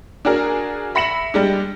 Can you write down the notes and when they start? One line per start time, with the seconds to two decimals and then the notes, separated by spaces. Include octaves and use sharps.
0.25 D4 F#4 G#4 A#4
0.95 E5 B5 A#6 C#7 E7 F#7
1.34 G3 G#3 D4